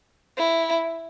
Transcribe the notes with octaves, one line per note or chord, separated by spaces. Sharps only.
E4